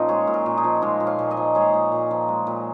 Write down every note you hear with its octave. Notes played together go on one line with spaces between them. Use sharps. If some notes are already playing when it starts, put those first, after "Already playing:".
Already playing: A#2 F3 C#4 D#4 F4
G#3 G#4 C#5
A#2
F4 A#4
A#2
D#4 G#4
F3
G#3 A#3 D#4
A#2
C#5 F5
A#2
A#4 D#5
F3
G#3 G#4 C#5
A#2
A#2
F3
G#3
A#2